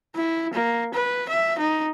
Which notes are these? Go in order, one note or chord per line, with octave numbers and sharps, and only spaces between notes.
E4
A#3
B4
E5
D#4